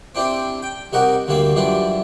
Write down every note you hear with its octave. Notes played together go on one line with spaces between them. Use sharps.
C4 D4 E4 G4 C5
G5
C2 D#4 F#4 G4 A#4 F#5
D2 D3 G3 A#3 C#5 F5
F#2 E3 G3 D4 E4 F4